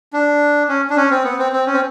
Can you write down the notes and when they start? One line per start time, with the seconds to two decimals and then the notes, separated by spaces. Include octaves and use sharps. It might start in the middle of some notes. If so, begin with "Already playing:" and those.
0.13 D4
0.69 C#4
0.90 D4
0.97 C#4
1.11 C4
1.24 B3
1.39 C4
1.52 C4
1.67 C#4
1.74 C4